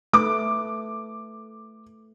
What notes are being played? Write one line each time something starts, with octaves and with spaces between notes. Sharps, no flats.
A3 B4 D6